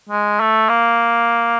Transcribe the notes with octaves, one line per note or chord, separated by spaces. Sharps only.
G#3
A3
A#3